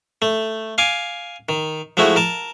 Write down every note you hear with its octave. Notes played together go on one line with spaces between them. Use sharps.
A3
F5 G#5 D6
D#3
F3 G#3 A3 E4 F#4
A#4 A5